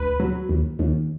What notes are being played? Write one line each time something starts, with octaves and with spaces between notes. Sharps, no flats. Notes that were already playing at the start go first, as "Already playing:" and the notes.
Already playing: D2 B4
F#3
D#2
D#2